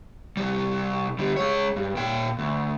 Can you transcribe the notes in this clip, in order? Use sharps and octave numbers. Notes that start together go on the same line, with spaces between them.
C3 G3
D3 G3
G#3 C#5
G2
A#2 G5
D2